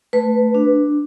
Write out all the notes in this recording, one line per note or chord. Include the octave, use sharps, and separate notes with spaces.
A3 B4
D4